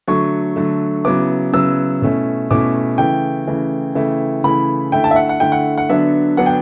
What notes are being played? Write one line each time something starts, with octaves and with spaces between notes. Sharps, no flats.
D3 F#3 A3 C#6
D3 F#3 A3
C#3 F#3 B3 E4 D6
C#3 F#3 B3 E4 E6
B2 A3 C#4 E4
B2 A3 C#4 E4 D6
C#3 E3 A3 G5
C#3 E3 A3
C#3 E3 A3 E4
C#3 E3 A3 E4 B5
D3 A3 E4 G5
A5
E5
F#5
F#5
D3 A3 E4 G5
F#5
F#5
D3 F#3 B3 D4 E5
D3 F#3 B3 D4 F#5
G5